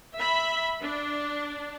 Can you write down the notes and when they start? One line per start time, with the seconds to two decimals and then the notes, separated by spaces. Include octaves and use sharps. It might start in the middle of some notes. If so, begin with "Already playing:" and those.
0.16 E5 B5
0.82 D4